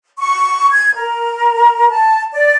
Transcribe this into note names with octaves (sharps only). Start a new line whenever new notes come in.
C#6
G#6
A#4
A5
D5